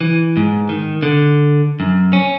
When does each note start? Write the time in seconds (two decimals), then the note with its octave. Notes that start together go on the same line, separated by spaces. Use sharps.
0.01 E3
0.37 G#2
0.69 D#3
1.03 D3
1.80 F#2
2.13 C#4